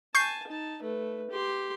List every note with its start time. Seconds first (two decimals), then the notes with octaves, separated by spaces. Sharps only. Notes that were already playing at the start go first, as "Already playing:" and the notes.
0.15 G#5 A5 C#6 G6 C7
0.48 D#4 A5
0.83 A3 B4
1.30 G4 C6